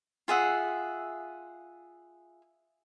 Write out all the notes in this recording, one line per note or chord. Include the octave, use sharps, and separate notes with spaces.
F4 G#4 E5 F#5